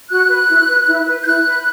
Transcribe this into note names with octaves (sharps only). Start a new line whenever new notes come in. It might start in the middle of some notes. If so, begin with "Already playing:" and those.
F#4 F#6
B4
E4
B4
E4
B4
G6
E4 F#6
B4